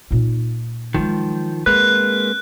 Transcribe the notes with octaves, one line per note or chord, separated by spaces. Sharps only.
A#2 D#4
D#3 F3 F#3 G#3
G#3 A#3 C4 B4 F#6